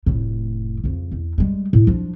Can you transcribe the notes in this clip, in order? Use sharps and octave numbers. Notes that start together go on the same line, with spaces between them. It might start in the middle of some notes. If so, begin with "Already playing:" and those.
F1 A2
F2 C#3
E2
G3 G#3
A2
F3 D4